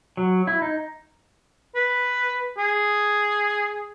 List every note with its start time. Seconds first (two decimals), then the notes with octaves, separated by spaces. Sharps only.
0.17 F#3
0.47 E4
0.62 D#4
1.75 B4
2.58 G#4